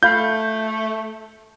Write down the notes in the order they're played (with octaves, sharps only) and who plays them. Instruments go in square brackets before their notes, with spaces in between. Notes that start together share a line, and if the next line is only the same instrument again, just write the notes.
[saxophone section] A3 [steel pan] F4 F5 B5 [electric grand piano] G6